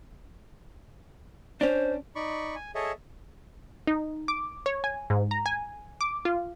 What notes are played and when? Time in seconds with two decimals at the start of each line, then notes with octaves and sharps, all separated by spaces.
1.61 C#4 D4 C5
2.15 D#4 D5 B5 C#6
2.56 G#5
2.75 G#4 A4 C#5 D#5 E5 A5
3.87 D#4
4.28 D6
4.66 C#5
4.84 G#5
5.10 G#2
5.31 A#5
5.46 G#5
6.01 D6
6.25 F4